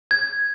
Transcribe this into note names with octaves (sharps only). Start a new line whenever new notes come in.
G#6